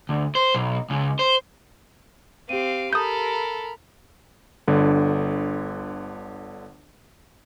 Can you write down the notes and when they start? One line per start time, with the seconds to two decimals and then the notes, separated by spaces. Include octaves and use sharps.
0.09 D2
0.35 C5
0.54 B1
0.90 C#2
1.19 C5
2.49 C4 G4 F5 D6 D#7
2.93 A4 A#4 B5 D#6 G6
4.68 G1 D3